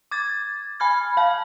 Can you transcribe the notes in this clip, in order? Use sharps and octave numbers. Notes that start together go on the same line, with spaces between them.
D6 G#6 A6
G#5 B5 F6 G#6
F5 A5